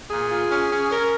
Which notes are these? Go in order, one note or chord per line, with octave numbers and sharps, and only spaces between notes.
A#2 G#4
F4
C#4
C#4
C#4 A#4